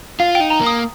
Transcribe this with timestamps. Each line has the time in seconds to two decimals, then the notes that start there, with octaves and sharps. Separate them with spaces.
0.20 F4 F5
0.35 G5
0.40 D#4
0.50 A#5
0.61 A#3
0.66 D#6